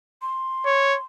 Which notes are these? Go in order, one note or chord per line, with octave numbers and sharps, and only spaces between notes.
C6
C#5